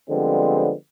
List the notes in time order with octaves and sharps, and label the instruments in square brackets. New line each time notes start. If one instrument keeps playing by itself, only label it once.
[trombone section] D3 F3 G3 G#3 B3 C4